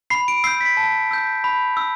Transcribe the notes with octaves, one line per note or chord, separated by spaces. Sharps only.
B5 C7
D7
E6 G6 C7
B6
A5
E6 G6
B5
E6